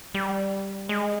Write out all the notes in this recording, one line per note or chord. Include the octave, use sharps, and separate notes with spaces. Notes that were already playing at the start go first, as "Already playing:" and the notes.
G3
G#3